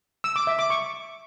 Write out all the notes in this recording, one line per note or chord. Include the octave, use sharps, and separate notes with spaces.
E6
D6
E5
D6
C#6